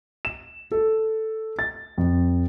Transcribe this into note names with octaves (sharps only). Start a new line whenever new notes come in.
E7
A4
A6
F2